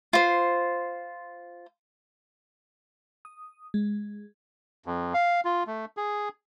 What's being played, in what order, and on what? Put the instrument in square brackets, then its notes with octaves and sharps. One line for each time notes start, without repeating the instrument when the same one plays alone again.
[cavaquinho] F4 C5
[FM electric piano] D#6
G#3
[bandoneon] F2
F5
F4
A3
G#4